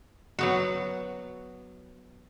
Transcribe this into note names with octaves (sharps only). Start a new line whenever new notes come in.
F#3 B3 F#4